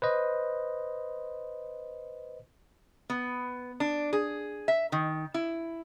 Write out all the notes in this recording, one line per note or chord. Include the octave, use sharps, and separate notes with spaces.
B4 C5 D#5
B3
D4
G#4
E5
D#3
E4